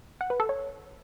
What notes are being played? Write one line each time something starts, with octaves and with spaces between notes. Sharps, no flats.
F#5
B4
A4
C#5